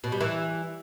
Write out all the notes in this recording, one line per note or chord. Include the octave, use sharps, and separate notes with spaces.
B2
G3
E3